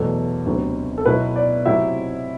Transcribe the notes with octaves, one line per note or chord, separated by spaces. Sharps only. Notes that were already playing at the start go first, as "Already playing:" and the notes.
Already playing: E2 B2 F#3 A3 A4
D2 C3 F#3 B3
A4
B2 F#3 B3 E4 B4
D5
C3 F#3 C4 E4 E5